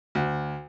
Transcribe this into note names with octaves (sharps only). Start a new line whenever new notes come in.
D2